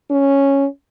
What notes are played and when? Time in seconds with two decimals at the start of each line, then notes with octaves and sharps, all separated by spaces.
0.10 C#4